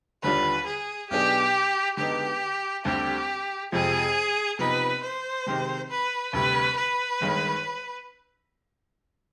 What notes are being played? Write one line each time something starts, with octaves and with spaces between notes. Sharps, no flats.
D#2 D3 G3 D4 F4 B4
G#4
B1 B2 B3 D4 G4 G#4
D3 G#3 B3 D#4 G4
D2 D3 G3 C4 G4
F2 C3 F3 G#3 G#4
C3 F3 B3 D#4 B4
C5
C3 D#3 G#3 C4 G4
B4
D2 C3 G3 B4
B4
G1 G2 D#3 G#3